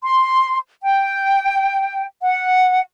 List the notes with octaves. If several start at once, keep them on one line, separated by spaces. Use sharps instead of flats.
C6
G5
F#5